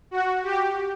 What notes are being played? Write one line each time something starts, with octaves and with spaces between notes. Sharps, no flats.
F#4
G4